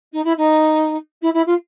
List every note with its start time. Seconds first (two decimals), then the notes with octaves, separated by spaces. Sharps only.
0.12 D#4
0.24 E4
0.37 D#4
1.22 E4
1.33 E4
1.46 F4